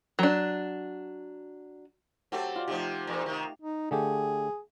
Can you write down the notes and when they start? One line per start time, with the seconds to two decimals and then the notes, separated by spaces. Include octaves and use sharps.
0.19 F#3 D4
2.32 F#3 A3 C4 G4 A5
2.56 F4 D5
2.68 C3 F3 A3 D#4 G4
3.07 E2 A#2
3.26 C3 D#3
3.61 D#4
3.91 D3 A3 G4 G#4